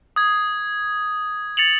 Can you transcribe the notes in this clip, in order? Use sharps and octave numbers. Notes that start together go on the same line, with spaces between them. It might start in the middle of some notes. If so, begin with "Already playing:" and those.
D#6 G#6
A6 C#7 F7 F#7